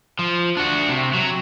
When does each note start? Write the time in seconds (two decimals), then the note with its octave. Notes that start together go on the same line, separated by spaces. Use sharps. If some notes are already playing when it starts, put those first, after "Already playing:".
0.19 F3
0.57 D4 F#4
0.89 C3
1.14 F#3